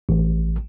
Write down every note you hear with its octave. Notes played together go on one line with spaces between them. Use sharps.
A1